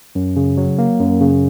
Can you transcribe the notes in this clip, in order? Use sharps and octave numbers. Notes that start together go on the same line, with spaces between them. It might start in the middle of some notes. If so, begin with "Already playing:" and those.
F#2
C#3
F#3
A#3
F#2
C#3